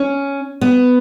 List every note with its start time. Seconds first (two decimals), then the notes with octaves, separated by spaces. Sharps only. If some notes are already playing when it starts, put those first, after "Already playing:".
Already playing: C#4
0.61 B3